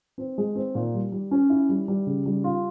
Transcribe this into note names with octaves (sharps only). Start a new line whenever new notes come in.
C4
G#3
C4
A#2
G3
G3
C#4
E4
G3
G3
C#3
G3
F4